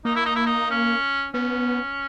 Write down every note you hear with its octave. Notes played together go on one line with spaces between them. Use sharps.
A#3 D#4
E4
D#4
E4
D#4
C#4
B3 C#4